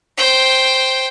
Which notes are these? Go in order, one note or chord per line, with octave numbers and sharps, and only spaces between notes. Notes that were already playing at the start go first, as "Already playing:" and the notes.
C5 G5